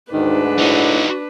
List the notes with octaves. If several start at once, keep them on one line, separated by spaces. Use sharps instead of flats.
D2 G#2 D#3 D4 B4
A2 D#4 F#4